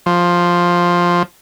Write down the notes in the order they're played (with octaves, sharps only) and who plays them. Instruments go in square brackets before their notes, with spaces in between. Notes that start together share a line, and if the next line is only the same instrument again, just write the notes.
[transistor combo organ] F3